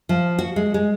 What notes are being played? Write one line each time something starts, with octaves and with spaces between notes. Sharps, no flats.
F3
F#4
G#3
G#3